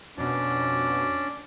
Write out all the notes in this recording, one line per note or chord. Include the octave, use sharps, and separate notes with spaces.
F2 B2 C#4 D4 D5